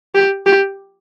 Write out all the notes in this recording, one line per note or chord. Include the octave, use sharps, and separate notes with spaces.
G4
G4